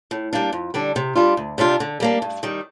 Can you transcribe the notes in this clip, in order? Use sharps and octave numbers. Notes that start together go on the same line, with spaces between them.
A2
G3 A#3 D4
F2
D3 G3 D4
C3
G3 D4 F4
D2
C3 G3 D4 F4
D3
G3 A#3 D4
G2
D#3 G3